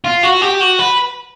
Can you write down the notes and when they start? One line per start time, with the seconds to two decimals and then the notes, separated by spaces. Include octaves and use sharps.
0.04 F4
0.23 F#4
0.41 G4
0.61 F#4
0.79 B4